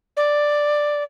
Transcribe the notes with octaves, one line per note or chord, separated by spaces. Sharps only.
D5